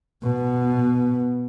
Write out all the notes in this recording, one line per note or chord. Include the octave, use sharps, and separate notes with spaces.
B2 B3